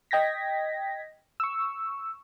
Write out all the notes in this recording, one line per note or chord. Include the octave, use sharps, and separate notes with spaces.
D#5 G5 G#6 A#6 B6
C#6 E6